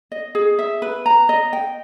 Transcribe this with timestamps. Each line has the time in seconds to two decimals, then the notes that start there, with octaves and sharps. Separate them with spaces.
0.12 D#5
0.35 G#4
0.59 E5
0.82 B4
1.06 A#5
1.29 D#5
1.53 G5